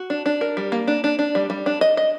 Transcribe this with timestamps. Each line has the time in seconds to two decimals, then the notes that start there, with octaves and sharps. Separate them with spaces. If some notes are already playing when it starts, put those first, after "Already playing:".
Already playing: F#4
0.10 D4
0.26 D4
0.41 A#4
0.57 G3
0.72 A#3
0.87 D4
1.04 D4
1.19 D4
1.35 G3
1.50 G3
1.66 D4
1.81 D#5
1.97 D#5